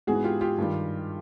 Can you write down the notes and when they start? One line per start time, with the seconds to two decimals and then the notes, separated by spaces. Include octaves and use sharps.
0.07 G#2 E3 G#3 B3 F#4 G#4
0.24 F4 G4
0.41 F4 G4
0.58 G2 D#3 G3